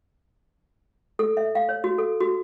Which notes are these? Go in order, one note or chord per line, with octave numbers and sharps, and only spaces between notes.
A4
E5
F5
C#5
F#4
A4
F#4